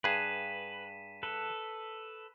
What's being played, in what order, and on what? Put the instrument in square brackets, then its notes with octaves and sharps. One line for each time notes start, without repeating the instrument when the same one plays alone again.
[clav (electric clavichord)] G2 G#4 [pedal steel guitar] B4 [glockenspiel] B6 D#7 E7
[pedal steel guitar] A4 B4